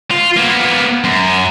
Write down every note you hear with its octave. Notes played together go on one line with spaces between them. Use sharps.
F4
A#3 B3
F#2